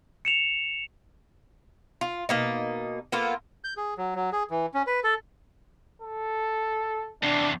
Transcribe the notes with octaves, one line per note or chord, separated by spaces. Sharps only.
C#7 E7 F7
F4
B2 A#3 D#4
A#3 B3 F4 A4
G6
G#4
F#3
F#3
G#4
E3
C#4
B4
A4
A4
E2 C3 D4